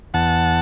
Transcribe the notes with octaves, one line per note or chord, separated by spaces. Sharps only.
E2 F#5 A5